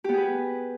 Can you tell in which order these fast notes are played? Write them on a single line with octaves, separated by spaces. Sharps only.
G4 B3 G#4 B4